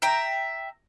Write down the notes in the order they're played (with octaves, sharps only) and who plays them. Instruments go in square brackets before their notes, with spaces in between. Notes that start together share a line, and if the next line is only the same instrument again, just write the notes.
[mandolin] E5 G5 A#5